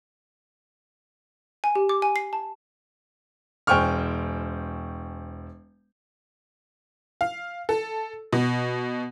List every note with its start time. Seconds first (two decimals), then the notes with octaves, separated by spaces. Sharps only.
1.64 G#5
1.75 G4
1.89 D6
2.02 G#5
2.16 C7
2.33 A5
3.67 E1 C5 G5 G#5 C#6 F6
7.21 F5
7.69 A4
8.33 B2